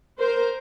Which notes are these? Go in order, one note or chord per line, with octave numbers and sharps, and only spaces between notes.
A#4 C5